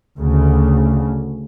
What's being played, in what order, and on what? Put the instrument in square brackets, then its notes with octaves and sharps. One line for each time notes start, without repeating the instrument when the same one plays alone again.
[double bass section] D2 C#3